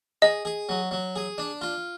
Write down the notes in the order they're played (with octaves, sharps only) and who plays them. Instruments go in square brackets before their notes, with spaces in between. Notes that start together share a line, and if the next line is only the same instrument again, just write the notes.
[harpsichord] G#4 [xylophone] D#5
[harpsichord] G#4
F#3
F#3
G#4
D4
F4